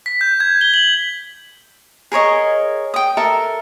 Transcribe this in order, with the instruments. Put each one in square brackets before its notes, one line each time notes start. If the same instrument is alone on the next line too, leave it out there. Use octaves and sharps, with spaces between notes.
[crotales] B6
G6
G#6
G7
F#7
[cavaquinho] G#4 A#4 C#5 D#5
G5 D#6
A4 A#4 E5